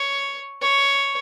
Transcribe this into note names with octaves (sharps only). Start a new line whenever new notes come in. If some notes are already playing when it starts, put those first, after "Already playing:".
Already playing: C#5
C#5